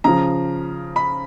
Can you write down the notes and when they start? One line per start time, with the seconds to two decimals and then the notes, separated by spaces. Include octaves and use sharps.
0.04 C#3 F3 A#5
0.96 B5